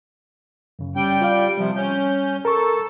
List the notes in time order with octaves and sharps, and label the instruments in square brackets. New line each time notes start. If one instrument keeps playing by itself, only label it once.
[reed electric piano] F#2 C#3
[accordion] G3 G5 [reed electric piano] C#4
[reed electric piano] F4 D5 F5
[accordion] C3 F3 [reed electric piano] G3
[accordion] C#4 G6
[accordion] A4 [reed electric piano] A#4 C#6